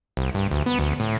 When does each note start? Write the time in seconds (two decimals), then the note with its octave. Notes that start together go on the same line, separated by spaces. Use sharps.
0.17 C2
0.35 G2
0.51 D2
0.66 B3
0.79 D2
1.00 A2